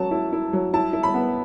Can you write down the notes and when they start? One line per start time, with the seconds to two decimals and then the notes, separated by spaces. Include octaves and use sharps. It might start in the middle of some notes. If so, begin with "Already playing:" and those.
Already playing: F#3 C#4 A5
0.11 E4
0.33 E4
0.53 F#3
0.73 E4 A5
0.93 E4
1.03 B5
1.14 B3